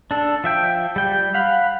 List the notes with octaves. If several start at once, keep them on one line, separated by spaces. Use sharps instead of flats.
D4 A4
F3 E5 G5
G3 G5
F5 F#5 B5